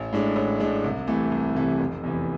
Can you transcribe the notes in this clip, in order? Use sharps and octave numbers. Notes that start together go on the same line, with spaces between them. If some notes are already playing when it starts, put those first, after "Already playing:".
Already playing: A1
A2 G#3 D4
A1
A2 G#3 D4
C2
C3 E3 A3
C2
C3 E3 A3
F1
E2 C3 E3